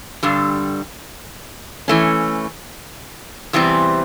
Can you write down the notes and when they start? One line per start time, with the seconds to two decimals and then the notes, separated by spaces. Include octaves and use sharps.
0.23 G2 D3 G3
1.88 E3 A3 C#4
3.53 E2 C3 E3 G3 C4